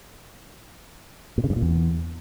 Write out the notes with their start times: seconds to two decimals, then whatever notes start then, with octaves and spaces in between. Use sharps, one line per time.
1.38 A#2
1.44 C#3
1.50 G2
1.56 A#2
1.62 E2